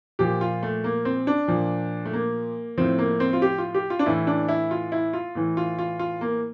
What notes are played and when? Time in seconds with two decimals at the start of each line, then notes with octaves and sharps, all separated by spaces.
0.19 A#2 F3 G4
0.41 F4
0.63 A3
0.84 A#3
1.05 C4
1.27 D4
1.48 A#2 F3
2.05 A3
2.13 A#3
2.78 A2 F3 C4
2.98 A#3
3.20 C4
3.33 F4
3.42 G4
3.58 F4
3.74 G4
3.90 F4
3.99 D4
4.06 A2 E3 E4
4.27 D4
4.48 E4
4.71 F4
4.92 E4
5.13 F4
5.35 A2 E3
5.57 F4
5.79 F4
5.99 F4
6.21 A#3